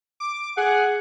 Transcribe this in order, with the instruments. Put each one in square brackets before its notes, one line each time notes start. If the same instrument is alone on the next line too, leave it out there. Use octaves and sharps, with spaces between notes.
[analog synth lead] D6
[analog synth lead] G#4 [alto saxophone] F#5